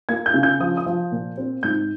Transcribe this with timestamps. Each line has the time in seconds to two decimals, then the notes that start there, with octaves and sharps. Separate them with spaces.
0.09 A#3 G#6
0.26 G6
0.34 C#3
0.43 G6
0.60 F3 D#6
0.77 D#6
0.86 F3
1.12 A#2
1.38 C4
1.63 G#2 G6